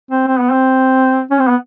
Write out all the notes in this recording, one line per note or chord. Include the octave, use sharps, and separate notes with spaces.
C4
C4
B3
C4
C#4
C4
B3